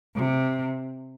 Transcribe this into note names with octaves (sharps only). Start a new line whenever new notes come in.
C3